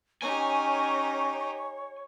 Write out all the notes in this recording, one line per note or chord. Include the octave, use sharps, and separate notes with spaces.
C#4 D#4 G4 C#5 G#5